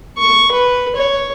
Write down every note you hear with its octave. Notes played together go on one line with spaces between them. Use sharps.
C#6
B4
C#5